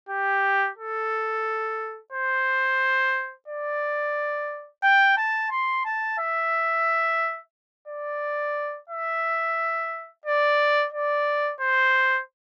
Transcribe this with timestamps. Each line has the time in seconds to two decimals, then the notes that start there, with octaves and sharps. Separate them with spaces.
0.09 G4
0.78 A4
2.12 C5
3.48 D5
4.83 G5
5.17 A5
5.51 C6
5.85 A5
6.19 E5
7.88 D5
8.89 E5
10.25 D5
10.92 D5
11.60 C5